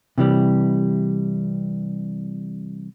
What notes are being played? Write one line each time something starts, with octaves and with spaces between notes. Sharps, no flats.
C3 E3 G3